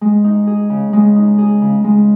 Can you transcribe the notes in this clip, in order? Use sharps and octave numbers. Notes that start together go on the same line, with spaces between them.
G#3
D#4
G#4
C#3
G#3
D#4
G#4
C#3
G#3